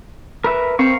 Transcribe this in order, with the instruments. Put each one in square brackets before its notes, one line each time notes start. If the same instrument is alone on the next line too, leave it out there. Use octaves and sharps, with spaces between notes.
[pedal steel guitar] A#4 B4 E5
[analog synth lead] C4 [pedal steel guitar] A#4 F5 C#6